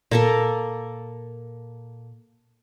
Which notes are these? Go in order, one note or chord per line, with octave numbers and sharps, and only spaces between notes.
A#2 A#3 A4 A#4